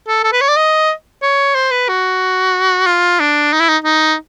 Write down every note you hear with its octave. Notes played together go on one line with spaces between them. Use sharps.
A4
A4
B4
C#5
D5
D#5
C#5
C5
B4
F#4
F4
D4
D#4
E4
D#4
D#4